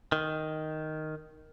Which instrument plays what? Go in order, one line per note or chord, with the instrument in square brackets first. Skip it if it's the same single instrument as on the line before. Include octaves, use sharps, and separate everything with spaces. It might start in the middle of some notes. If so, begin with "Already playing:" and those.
[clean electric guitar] D#3